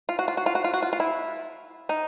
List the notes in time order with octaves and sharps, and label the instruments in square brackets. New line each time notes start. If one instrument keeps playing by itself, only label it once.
[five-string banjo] F4
F#4
F4
F#4
F4
F#4
F4
F#4
F4
F4
E4
D#4